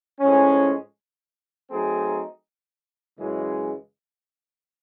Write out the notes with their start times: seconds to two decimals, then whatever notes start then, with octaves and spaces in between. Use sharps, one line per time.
0.20 A2 F3 G#3 C#4
1.69 F#3 A3 C4 D#4 G#4
3.19 F#2 C#3 E3 G#3